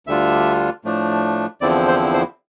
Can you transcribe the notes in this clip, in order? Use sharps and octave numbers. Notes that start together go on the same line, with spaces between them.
D2 D3 G3 D4 F4 E5
A2 F3 A3 D4
E2 D3 F3 C4 E4 D5
C5
C5